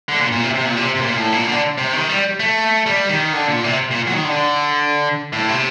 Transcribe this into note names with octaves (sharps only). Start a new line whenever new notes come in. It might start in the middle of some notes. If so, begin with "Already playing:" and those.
D3
A#2
A#2
C3
C3
A#2
C3
C3
A#2
A2
A#2
D3
C3
D#3
G3
A3
G3
D#3
D3
A#2
C3
A#2
F#3
D#3
D3
A2
C3